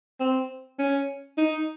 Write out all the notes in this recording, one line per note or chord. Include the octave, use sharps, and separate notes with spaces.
C4
C#4
D#4